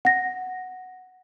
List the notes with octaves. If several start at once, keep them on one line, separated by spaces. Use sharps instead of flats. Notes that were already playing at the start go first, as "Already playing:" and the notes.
F#5 A#6